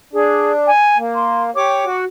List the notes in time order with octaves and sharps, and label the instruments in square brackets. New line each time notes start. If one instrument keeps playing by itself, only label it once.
[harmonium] D4 [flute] G#4
[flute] G#5
[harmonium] A#3
[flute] C6
[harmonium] G4 C#5 [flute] D6
[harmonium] F#4